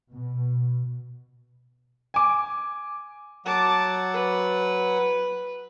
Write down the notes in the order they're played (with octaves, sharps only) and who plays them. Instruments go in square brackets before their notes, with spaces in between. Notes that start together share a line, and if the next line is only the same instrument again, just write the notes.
[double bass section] B2
[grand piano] G#5 D6
[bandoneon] F#3 F#5 [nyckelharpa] A5 D6
[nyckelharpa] B4